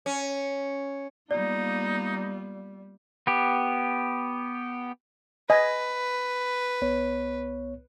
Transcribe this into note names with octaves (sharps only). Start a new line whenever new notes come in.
C#4
G3 A#3 B3 D#4 F4 D5
B3 G4
B4 D#5 G#5
C2 B3 C#5